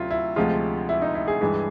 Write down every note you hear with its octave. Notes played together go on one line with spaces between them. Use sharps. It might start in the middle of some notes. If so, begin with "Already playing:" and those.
Already playing: D2 C3 F#3 E4 F4
E4
D2 C3 F3 G#3 F4
E4
D#4
E4
G#4
G2 E3 G#3